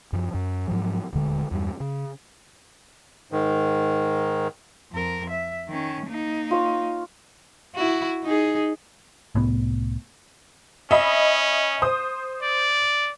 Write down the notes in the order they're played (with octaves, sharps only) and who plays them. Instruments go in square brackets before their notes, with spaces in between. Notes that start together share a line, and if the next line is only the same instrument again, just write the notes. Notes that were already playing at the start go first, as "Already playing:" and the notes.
[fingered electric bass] F#2 F3
F#2
G#2 F3 F#3
D#1 D2 D3 G#3
E2 G2 G3
C#3
[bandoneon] G#2 D#3
[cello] F2 A#4
E5
D#3 C#4
A#3 D#4
[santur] F4 C#5
[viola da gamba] E4 F#4
D#4 G#4
[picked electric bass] C2 A2 B3
[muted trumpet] C#4 [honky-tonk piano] D#5 E5 B5
[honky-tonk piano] C5 D#6
[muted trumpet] D5